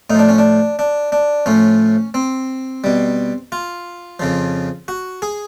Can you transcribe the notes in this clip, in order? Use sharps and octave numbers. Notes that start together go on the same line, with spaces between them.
A2 D#4
F3 D4
C#4
D4
D4
D4
A2 F3 C#4
C4
B2 G3
F4
F2 C#3 F3
F#4
G#4